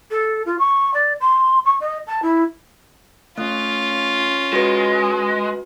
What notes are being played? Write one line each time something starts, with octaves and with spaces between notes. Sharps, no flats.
A4
F4
C#6
D5
C6
C#6
D#5
A5
E4
A3 C#4 F4
G#3 F#4 B4